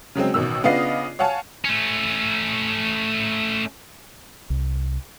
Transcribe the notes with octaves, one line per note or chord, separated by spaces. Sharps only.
C#3 F#3 G#3 C4
A1 B2 D#3 E6
C#3 B3 D4 F4 D#5 C7
C#5 F5 F#5 G#5 A5
A3 C#4
C2